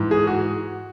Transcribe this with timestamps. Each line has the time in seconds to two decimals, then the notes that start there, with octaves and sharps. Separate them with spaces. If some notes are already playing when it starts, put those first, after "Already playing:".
Already playing: G#2 E3
0.11 G#4
0.27 F#4